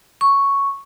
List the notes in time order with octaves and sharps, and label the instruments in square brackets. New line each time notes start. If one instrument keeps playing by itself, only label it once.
[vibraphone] C#6